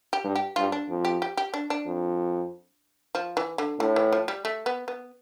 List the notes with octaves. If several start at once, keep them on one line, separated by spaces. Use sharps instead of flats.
G4
G2
G4
G2 F4
D4
F2
G4
G4
G4
D4
D4
F2
F3
E3
D3
A2 D3
E3
F3
G3
A3
B3
B3